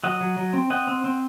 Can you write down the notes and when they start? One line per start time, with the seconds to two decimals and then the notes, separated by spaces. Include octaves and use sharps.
0.04 F#3 D#5 F#5
0.20 F#3
0.37 F#3
0.53 C4
0.70 C4 D#5 F#5
0.87 C4
1.04 C4